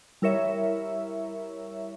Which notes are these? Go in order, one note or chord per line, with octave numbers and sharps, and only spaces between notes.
G3 E4 A#4 C#5 E5